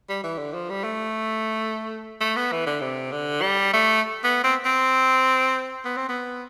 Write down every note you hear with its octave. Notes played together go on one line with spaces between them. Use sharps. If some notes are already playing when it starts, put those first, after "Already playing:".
G3
E3
D3
F3
G3
A3
A3
B3
E3
D3
C3
D3
G3
A3
B3
C4
C4
B3
C4
B3